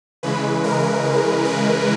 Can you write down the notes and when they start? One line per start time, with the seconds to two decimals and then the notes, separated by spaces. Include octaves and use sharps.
0.23 C#3 E3 G#3 B4
0.64 A#4
1.45 B4